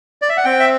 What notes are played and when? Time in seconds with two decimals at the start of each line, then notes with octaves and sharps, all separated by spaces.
0.22 D5
0.29 E5
0.37 F#5
0.45 C4 G5
0.60 E5